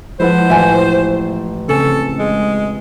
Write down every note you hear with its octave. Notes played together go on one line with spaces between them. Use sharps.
F3 G#3 E4 A4 B4 C5 F#5
A1 F4 E5 G#5
C#3 C4 C#4 A4
G#3